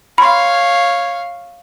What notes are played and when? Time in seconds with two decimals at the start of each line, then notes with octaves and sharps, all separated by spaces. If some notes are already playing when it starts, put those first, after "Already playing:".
0.18 C#5 F5 B5 C6